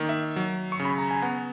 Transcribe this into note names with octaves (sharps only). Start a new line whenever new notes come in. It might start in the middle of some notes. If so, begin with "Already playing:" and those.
Already playing: D#3 A#3
E5
F#3
C#6
C#3
B5
A#5
G#5
B3 F#5